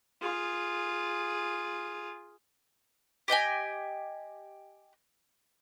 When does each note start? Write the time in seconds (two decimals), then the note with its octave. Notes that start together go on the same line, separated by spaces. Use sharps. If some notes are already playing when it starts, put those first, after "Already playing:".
0.21 F4 G#4
3.28 G4 D#5 G5 G#5